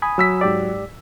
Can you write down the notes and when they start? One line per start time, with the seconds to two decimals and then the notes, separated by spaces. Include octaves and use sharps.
0.02 G#5 B5 D#6
0.18 F#3 E6 B6
0.41 G#2 G4 D5